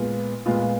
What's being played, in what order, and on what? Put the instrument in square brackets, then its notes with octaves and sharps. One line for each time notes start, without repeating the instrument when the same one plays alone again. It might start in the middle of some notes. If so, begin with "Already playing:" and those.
Already playing: [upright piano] A#2 G#3 B3 F4
A#2 G#3 B3 F4